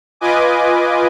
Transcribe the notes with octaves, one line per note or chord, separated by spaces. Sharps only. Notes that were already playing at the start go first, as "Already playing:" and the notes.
F4 B4 D#5 G#5 D6